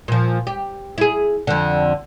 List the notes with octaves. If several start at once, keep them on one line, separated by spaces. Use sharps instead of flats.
A#2 F3
G4
E4 G#4
F2 D3